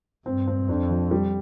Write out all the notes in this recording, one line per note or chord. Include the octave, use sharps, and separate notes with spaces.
G2 C4
C4
F2 D4
F3
G3